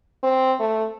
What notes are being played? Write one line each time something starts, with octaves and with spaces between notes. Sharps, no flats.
C4
A3